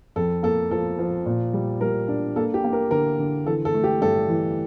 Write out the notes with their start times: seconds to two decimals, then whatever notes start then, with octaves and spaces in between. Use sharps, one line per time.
0.16 F2 A4
0.43 A#3 A4
0.71 F3 A4
0.99 F3
1.26 A#2
1.53 G3
1.81 G3 A#4
2.08 D4
2.36 A#3 A4
2.54 G4
2.64 A#3
2.73 A#4
2.91 D3 A#4
3.19 D3
3.46 E3 A4
3.65 A4
3.74 A3
3.84 G4
4.01 G2 A4
4.29 E3